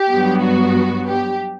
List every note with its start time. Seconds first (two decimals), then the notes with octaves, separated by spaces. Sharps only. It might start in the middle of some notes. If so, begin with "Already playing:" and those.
Already playing: G4
0.09 G2 F#3 B3
0.42 F#4
1.07 G4